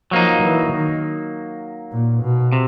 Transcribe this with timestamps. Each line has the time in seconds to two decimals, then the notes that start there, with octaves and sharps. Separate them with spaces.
0.11 F3 F#3 A#3 D#4
0.42 E3
0.72 D#3
1.92 A#2
2.23 B2
2.52 C3